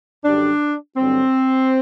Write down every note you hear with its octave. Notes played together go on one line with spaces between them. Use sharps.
F#2 D3 G3 D4
G2 D3 F#3 C4